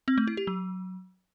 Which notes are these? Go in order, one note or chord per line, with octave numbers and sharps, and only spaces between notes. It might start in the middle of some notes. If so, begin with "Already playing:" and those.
C4
A3
E4
G4
F#3